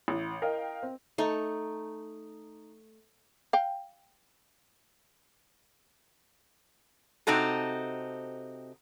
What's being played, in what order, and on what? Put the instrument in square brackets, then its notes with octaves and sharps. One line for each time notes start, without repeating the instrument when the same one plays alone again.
[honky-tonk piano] A1
A#4 D#5 F5 G5
C4
[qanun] A3 D#4 C#6
[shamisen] F5 G5
[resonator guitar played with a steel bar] C3 C4 D#4 F#4 A4